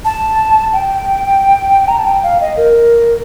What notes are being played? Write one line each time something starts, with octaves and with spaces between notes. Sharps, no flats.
A5
G5
A#5
A5
G5
F5
D#5
A#4